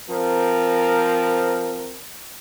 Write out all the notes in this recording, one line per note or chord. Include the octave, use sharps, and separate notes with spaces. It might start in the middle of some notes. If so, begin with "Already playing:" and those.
F3 C4 A#4